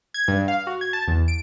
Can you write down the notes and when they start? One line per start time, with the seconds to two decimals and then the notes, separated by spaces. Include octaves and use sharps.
0.14 G#6
0.28 G2
0.48 F5
0.67 F#4
0.81 G#6
0.93 A5
1.07 E2
1.28 D7